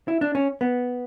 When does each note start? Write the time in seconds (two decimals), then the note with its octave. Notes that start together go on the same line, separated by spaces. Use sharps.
0.08 E4
0.21 D4
0.35 C#4
0.61 B3